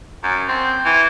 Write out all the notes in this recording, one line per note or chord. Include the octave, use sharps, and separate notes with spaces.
F#2
C4
E3